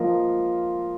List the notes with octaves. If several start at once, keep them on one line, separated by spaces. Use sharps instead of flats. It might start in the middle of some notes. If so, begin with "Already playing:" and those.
Already playing: F3 A#3 F4 A#4 D#5